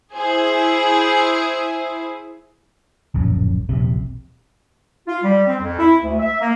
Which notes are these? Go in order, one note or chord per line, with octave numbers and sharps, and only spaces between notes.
E4 G#4 C5
D1 A#1 F#2
D#1 A#1 C3
F4
G3
C4
F2
E4
D2
E5
A#3